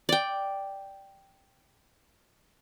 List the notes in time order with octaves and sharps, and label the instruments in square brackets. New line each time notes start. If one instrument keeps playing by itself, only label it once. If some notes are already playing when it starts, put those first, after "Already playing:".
[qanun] D5 G5